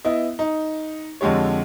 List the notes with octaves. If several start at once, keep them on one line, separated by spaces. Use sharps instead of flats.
B3 E4 D#5
D#4
F2 D3 G#3 G4 C#5